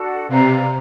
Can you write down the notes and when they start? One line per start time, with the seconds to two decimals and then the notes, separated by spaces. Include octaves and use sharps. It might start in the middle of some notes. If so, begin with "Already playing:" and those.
Already playing: D4 F#4 A4
0.29 C3 B4 D5 F5 A#5